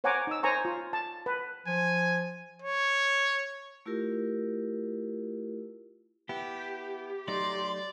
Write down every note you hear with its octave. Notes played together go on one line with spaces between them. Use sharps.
C5 C#5 F#5 G#5 A#5 D6
D#4 E6
C5 C#5 G#5 A#5 C#6
F4
A5
B4
F3 G#5
C#5
A3 E4 F4 G4 A#4
B3 E4 G4
F#3 A3 D#4 D5 C6